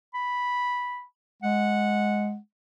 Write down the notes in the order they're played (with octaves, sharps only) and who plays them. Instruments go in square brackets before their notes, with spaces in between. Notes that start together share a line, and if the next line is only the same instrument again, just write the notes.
[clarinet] B5
[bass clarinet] G#3 [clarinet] F#5